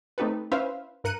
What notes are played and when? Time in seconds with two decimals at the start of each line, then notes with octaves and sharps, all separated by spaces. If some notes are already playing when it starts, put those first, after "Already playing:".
0.18 A3 C4 D#4 G4 A4 B4
0.52 C#4 E4 B4 C5 E5 F5
1.04 G2 A#4 F#6 C#7 D#7